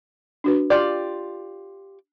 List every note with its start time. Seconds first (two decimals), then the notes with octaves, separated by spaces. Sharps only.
0.44 D4 F#4 B4
0.70 F4 G4 D5